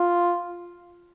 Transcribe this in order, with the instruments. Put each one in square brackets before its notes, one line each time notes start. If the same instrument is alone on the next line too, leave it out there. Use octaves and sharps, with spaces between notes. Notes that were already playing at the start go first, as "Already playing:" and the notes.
Already playing: [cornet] F4